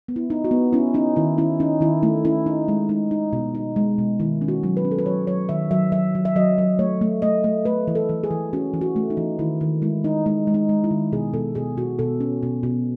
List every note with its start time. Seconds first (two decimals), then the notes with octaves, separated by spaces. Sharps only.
0.08 B3
0.16 E4
0.30 D#4
0.44 F#4
0.51 B3
0.73 C#4 E4
0.94 C#4 D#4
1.16 D#3 E4
1.38 C#4 E4
1.60 C#4 D#4
1.81 D#3 E4
2.03 A3 E4
2.25 C#4 E4
2.46 D#4
2.68 G#3
2.89 D#4
3.11 D#4
3.33 B2
3.55 D#4
3.76 G#3
3.98 B2
4.20 D#3 E4
4.41 C#4
4.48 F#4
4.63 F#3
4.77 B4
4.85 C#4
4.91 A4
4.98 B4
5.06 F#3 C#5
5.27 F#3 C#5
5.49 D#3 E5
5.71 F#3 E5
5.92 F#3 E5
6.15 F#3
6.25 E5
6.36 F#3 D#5
6.58 F#3
6.79 A3 C#5
7.01 A3
7.22 A3 D#5
7.44 A3
7.65 A3 B4
7.88 E3
7.95 A4
8.09 E3
8.24 G#4
8.31 E3
8.53 C#4 F#4
8.74 E3
8.81 F#4
8.96 A3
9.10 D#4
9.17 E3
9.39 D#3 E4
9.61 D#3
9.82 G#3 E4
10.04 D#4
10.26 G#3 D#4
10.47 G#3
10.54 D#4
10.69 G#3
10.84 E4
10.91 D#3
11.12 B2 G#4
11.33 B2 A4
11.55 B2 G#4
11.77 B2 F#4
11.99 B2 A4
12.20 C#4
12.43 B2
12.63 B2